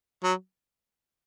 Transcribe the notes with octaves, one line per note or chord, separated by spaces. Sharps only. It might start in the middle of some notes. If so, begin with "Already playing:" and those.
F#3